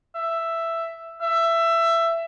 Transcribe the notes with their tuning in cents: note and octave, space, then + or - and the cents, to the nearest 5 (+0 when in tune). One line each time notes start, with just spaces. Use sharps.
E5 +5
E5 +15